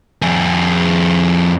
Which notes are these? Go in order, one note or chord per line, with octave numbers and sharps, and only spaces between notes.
F2 G#4